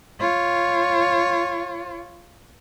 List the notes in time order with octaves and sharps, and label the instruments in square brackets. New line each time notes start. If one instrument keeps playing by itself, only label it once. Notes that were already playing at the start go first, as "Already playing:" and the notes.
[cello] F4 C#5